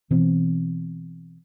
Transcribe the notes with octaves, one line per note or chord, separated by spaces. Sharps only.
B2 E3 B3 C4